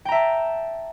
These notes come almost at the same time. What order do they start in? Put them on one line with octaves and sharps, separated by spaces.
G5 A#5 E5 A5